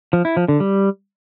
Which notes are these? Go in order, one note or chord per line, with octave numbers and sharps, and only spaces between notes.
F3
E4
F3
D3
G3